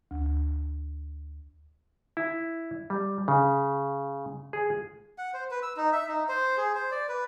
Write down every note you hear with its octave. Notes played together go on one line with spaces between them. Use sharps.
D2
E4
G3
C#3
G#4
F#5
C5
B4
E6
D#4
E5
D#4
C5
G#4
C5
D5
B4